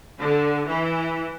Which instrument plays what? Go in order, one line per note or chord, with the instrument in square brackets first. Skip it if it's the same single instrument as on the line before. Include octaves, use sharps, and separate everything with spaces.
[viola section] D3
E3